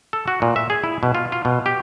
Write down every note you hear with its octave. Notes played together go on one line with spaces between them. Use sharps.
A4
F#4
A#2
E5
G#4
E4
B2
F4
F4
B2
G4